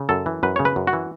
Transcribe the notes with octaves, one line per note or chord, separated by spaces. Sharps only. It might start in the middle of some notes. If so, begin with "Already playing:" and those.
Already playing: C#3
F#2 A4
E3
F#2 B4
C#3 C#5
B4
F#2
F#4
E3